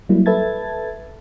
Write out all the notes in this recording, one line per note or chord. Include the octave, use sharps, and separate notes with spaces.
F#3 G3 A#3 E4
A4 B4 E5 A5 G#6 A6